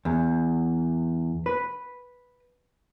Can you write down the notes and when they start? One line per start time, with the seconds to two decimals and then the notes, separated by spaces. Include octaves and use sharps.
0.05 E2
1.46 B4